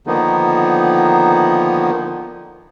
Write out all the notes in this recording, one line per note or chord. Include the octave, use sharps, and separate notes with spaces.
D3 D#3 F3 A#3 B3 D#4